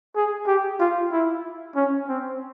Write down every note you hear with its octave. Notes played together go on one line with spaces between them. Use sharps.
G#4
G4
F4
E4
C#4
C4